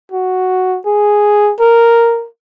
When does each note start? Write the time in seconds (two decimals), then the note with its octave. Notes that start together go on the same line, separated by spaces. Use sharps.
0.12 F#4
0.86 G#4
1.60 A#4